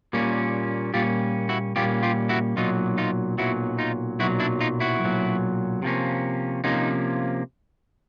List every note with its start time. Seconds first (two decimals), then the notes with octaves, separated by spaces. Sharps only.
0.13 A#2 G3 A#3 C#4
0.94 A#2 G3 A#3 C#4 F4 G4
1.49 E4 F#4
1.76 A#2 G3 A#3 C#4 F4 G4
2.03 F4 G4
2.29 E4 F#4
2.57 B1 A#2 F#3 D#4 F4
2.98 D#4 F4
3.38 B1 A#2 F#3 E4 F#4
3.79 D#4 F4
4.19 B1 A#2 F#3 E4 F#4
4.40 D4 E4
4.61 D#4 F4
4.80 E4 F#4
5.01 B1 A#2 F#3
5.82 C3 F3 A#3 C#4
6.64 C3 F3 A#3 C#4 D#4